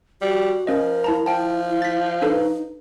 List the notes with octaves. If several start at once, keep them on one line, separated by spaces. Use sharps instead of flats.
G3 F#4
F3 C#4 A#4 D#5
E4 A5 A#5
F3 E4 G5 A5
A6 B6
D4 D#4 A4 B4